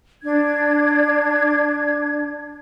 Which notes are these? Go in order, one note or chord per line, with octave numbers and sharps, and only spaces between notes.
D4 G#6